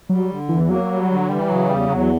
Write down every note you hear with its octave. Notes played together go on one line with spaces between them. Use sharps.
F#3 G3
D3
E2 E3
F#3 A#3
G3
D3
E3 G3
C#3 F#3
E2 G3
E2 F#3